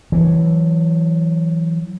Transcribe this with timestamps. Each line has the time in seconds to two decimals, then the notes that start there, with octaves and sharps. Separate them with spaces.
0.12 E3 F#3